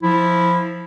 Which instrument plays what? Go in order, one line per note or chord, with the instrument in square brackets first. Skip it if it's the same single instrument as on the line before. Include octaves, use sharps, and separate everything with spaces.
[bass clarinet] F3 [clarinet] E4